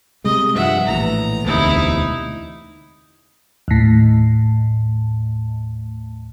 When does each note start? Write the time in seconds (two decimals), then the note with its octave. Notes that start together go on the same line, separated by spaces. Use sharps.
0.24 C3 G3 G#3 D#5
0.56 G2 F3 E5 F#5
0.87 A#1 A2 E3 A#5
1.46 E1 D2 C3 D#4 E4
3.68 D#2 A2